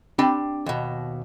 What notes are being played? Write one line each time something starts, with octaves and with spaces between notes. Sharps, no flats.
C4 D4 G4 G5 B5
D#2 B2